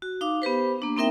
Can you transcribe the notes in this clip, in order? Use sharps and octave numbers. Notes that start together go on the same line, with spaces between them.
F#4
D#4 F5 D6
B3 G4 B4 C5
A#3 D4
A#3 C4 D#4 A#4 E5 G5